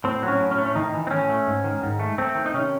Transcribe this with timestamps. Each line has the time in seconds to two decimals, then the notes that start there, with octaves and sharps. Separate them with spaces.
0.04 A2 C4
0.23 F#3
0.28 C#4
0.40 A2
0.51 C#4
0.58 A3
0.65 C#4
0.75 A2 D#3 D#4
0.94 E3
1.07 C4
1.11 A2 C#4
1.29 A3
1.47 G#2
1.64 D#3
1.83 G#2
2.00 A3
2.18 A3 C4
2.35 D#3
2.46 D#4
2.54 C3 C#4